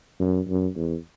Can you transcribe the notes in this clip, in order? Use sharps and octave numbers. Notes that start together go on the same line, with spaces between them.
F#2
F#2
E2